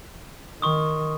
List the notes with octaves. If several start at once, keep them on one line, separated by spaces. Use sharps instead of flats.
D#3 C6 C#6 D#6